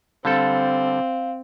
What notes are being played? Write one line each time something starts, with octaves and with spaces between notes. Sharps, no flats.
D3 G3 C4 A4 F5